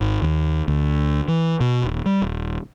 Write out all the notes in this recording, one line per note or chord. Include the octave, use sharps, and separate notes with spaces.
G#1
D#2
D2
E3
B2
D#1
G3
D#1